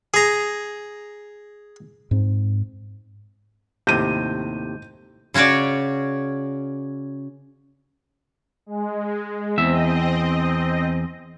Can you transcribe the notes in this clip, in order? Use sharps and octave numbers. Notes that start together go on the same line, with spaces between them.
G#4 A#5
G#2 C4
D#2 A2 C3 G6 D#7
C#3 C#4 F#4 C#5 D5
G#3
E2 C4 D#5 E5